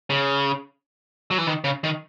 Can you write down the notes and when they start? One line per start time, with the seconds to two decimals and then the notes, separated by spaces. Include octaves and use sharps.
0.10 C#3
1.31 F#3
1.38 E3
1.47 D#3
1.64 C#3
1.84 D#3